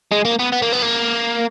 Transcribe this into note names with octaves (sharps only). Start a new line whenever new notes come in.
G#3
A#3
B3
B3
A#3
B3
A#3